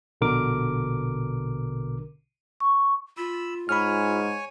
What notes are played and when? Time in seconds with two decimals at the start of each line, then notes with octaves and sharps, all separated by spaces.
0.21 A#1 B2 D3 A#4 D6
2.60 C#6
3.17 F4 B5 E6
3.69 G#2 C#5 G#5 B5 F6